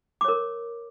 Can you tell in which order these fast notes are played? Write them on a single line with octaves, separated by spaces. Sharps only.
D6 C#5 A#4